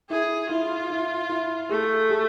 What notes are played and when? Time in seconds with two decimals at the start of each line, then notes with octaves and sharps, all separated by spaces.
0.10 E4 G#4
0.49 E4 F4
0.90 E4
1.29 E4
1.69 A3 G#4
2.10 G#4